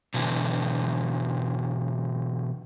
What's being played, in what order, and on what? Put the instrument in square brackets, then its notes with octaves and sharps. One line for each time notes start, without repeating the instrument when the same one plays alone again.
[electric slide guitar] B2 D3 E3